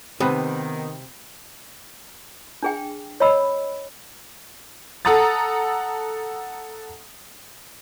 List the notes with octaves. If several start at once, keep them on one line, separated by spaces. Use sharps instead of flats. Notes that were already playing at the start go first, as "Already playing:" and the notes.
C3 D#3 B3 G4 B4 C5
D4 G#4 G5
C#5 D#5 B5 E6
A4 F#5 A#5 D#6 A6